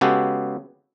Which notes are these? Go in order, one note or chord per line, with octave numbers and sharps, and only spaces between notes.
C#3 G#3 B3 F#4 G4 A4